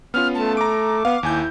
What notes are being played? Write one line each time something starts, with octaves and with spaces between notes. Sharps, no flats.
B3 C#4 F4 F6
A3 A5
A#5 D6 D7
B3 F5
D#2 E4 G#5 G6